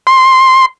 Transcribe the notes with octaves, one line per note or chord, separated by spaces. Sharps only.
C6